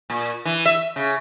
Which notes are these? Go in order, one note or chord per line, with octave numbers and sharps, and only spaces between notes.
A#2
E3
E5
C#3